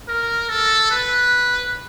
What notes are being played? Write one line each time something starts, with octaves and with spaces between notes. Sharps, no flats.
A#4
A4
B4